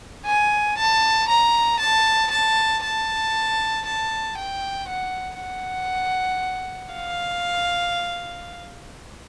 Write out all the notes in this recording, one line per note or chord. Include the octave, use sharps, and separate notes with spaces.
G#5
A5
A#5
A5
A5
A5
A5
G5
F#5
F#5
F5